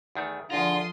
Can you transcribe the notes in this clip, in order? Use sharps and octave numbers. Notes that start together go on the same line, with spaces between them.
E2 D#3 A3
E2 D3 F3 F4 A#5 C6 D#6